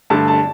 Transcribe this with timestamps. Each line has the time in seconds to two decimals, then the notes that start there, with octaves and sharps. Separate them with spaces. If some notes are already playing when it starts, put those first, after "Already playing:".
0.10 G2 D3 A3 A5
0.28 A5